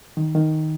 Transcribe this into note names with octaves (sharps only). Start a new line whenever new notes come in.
D#3
D#3